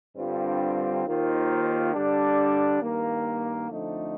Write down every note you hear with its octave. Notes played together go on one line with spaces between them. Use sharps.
G2 D3 G3 C4 F4
D#2 D#3 A#3 F4 C5
D3 G3 D4
G2 D#3 A#3
F2 D3 F3 A3 D#4